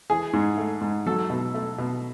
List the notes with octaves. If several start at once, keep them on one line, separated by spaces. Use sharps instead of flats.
E3 G#4
G#2
A3
G#2
F#3 A4
B2
A3
B2